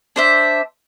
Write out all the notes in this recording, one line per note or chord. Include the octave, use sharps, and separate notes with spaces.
D4 C5 E5